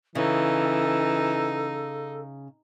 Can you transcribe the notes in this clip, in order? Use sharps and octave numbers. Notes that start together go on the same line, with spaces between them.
C#3 E3 D#4 A4